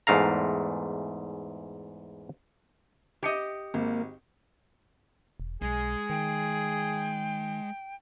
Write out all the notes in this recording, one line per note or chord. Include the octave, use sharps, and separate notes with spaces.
E2 G#2 A3 F5 A#5
G4 D#5 D6 C#7
G#1 A#3
E1
B1 G#3 G#4
D#3 G5